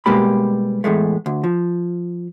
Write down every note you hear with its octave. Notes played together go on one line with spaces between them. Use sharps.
B2 G3 G#3 A#3 G4 B5
E2 A2 G#3 A3
D2
F3